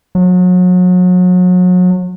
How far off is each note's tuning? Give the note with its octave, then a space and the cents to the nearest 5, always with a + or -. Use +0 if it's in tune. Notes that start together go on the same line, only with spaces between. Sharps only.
F#3 -35